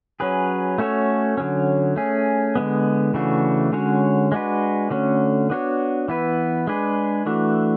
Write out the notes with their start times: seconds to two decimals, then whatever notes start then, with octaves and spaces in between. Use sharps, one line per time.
0.20 F#3 C#4 G#4 B4
0.78 A3 C#4 F#4 A4 C#5
1.38 D3 F#3 C#4
1.96 A3 C#4 G#4
2.55 D3 G#3 B3
3.14 C#3 E3 A3 D4 F#4
3.73 D3 G#3 C#4 F#4 C#5
4.32 G#3 D4 F#4 B4
4.90 D3 A3 C#4 F#4
5.50 B3 D4 F#4 C#5
6.08 E3 B3 E4 B4
6.67 G#3 D4 G#4 B4
7.26 E3 A3 D4 F#4